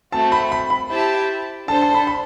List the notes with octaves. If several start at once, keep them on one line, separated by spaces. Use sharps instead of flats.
A3 C4 F#4 A5
B5
B5
B5
E4 G4 C5 E5 A5
D4 A4 C5 A5
A5
B5
B5